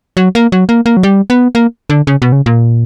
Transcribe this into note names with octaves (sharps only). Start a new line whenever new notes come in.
F#3
A#3
F#3
A#3
A#3
F#3
G3
B3
A#3
D3
C#3
B2
C#3
A#2